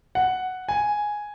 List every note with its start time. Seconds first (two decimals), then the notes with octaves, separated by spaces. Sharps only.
0.15 F#5
0.68 G#5